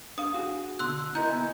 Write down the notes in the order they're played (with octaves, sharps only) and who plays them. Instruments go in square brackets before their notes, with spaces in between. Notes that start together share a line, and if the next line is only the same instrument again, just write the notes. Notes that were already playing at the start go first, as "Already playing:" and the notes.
[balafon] D4 F5 [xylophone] D#6
[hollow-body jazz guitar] F#4 G#4
[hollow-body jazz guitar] B2 D3 [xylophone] C6 E6 F#6
[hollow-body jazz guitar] E4 [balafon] A#4 D#5 A#5 [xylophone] G6
[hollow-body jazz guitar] B3 E5 G#5